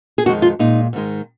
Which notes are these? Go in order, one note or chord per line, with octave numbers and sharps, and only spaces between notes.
G#4
F2 D#3 G#3 F#4
F4
A#2 G#3 D#4
G#2 D#3 G#3